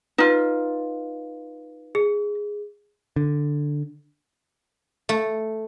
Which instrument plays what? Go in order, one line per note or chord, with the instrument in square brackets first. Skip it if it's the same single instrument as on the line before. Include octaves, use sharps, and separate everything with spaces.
[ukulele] D#4 F4 [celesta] B4
[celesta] G#4
[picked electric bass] D3
[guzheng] A3